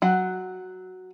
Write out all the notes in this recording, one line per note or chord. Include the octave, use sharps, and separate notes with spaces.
F#3 F#5